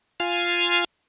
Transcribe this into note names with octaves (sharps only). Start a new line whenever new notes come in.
F4 F5 G#5